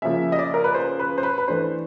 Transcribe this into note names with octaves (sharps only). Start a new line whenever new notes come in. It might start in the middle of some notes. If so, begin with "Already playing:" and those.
C#3 F3 A#3 C#4 E5
D#5
D5
A#4
B4
C5
B4
C5
B4
B4
E3 A3 D4 C5